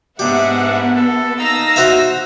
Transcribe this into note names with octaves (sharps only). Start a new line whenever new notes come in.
G#2 B3 D4 G4 E5 F#5
A4
D#4 F5 A#5 E6 A#6
F#4 C5 E5